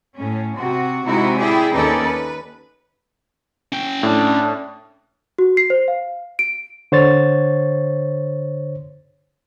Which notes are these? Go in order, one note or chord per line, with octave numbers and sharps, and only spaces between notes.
A2 C#4
C3 F#4
C3 G#3 C4 D#4 E4 F#4
E4 G4 G#4 D5
D#2 C#4 D#4 A4 B4 D5
B4
C#4 G5
A2 D4
F#4
C7
C5
F5
D7
D3 C5 C#5 A6